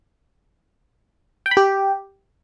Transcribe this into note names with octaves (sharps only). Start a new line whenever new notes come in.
G5
B5
G4